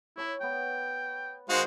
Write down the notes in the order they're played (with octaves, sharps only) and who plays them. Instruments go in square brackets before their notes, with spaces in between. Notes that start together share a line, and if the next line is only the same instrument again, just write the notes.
[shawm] E4 [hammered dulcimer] C#5 A5
[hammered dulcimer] B3 A#5 [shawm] G5
[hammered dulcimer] D#3 D#4 [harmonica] G#3 F#4 F5 [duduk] C5